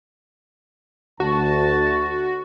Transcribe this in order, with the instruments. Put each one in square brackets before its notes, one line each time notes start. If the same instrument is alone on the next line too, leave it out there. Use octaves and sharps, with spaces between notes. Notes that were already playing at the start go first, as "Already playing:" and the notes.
[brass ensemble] D2 A5 [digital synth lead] F#4